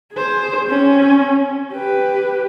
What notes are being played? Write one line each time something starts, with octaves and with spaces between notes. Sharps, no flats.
G#4 C5
C4 C#4
G4 B4